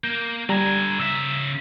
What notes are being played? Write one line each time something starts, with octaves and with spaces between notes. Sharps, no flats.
A#3 G6
D3 G3 G#5 A#5
C#3 E5 E6